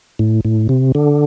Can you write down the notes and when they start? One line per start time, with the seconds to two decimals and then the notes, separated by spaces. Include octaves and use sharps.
0.19 A2
0.45 A2
0.69 C3
0.95 D3